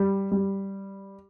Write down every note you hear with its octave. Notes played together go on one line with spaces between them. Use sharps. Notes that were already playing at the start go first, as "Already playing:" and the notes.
Already playing: G3
G3